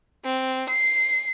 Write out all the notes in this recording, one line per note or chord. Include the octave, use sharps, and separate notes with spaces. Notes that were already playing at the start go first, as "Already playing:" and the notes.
C4
C7